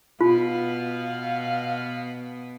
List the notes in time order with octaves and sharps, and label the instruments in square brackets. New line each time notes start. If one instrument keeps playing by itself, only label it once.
[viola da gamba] B2 B3 [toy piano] F4 [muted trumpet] F5